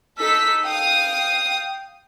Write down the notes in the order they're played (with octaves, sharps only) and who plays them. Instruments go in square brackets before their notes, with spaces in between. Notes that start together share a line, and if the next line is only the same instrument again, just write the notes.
[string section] D#4 A4 B6 [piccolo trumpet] E6
[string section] F5 D#6 [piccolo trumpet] G5